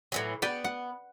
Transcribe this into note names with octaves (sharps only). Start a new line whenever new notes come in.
A2 E3 F#3
B3 B4 D5 G5
F#5